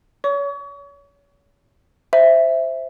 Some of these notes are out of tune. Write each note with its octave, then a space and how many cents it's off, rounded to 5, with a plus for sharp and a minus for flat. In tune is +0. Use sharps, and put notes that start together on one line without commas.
C#5 +35 C#6 +35
C5 -5 E5 +0